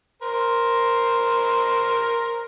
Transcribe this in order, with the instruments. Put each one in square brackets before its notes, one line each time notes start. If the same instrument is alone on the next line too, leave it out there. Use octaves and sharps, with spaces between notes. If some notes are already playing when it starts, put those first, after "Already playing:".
[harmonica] A#4 C5